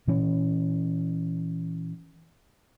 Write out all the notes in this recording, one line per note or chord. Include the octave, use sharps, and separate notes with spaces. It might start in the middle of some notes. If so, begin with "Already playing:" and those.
A#2 E3 C#4